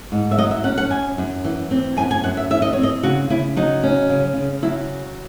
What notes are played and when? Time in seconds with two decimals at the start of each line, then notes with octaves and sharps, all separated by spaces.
0.12 G#2
0.31 E5
0.38 F#3 D#5
0.51 E5
0.64 C#4 F#5
0.78 F#5
0.90 F#2 G#5
1.18 F#2
1.44 E3
1.71 C4
1.97 F#2 G#5
2.11 G#5
2.24 F#2 F#5
2.37 E5
2.50 E3 E5
2.62 D#5
2.73 C4 C#5
2.83 D#5
3.03 C#3 F#4
3.30 C#3 E4
3.57 F#3 D#4
3.83 C#4
4.09 C#3
4.37 C#3
4.62 F#3 E4